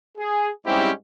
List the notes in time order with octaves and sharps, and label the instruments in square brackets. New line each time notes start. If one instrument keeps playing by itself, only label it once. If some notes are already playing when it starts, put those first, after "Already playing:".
[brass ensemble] G#4
G#2 G3 C4 C#4 E4 G4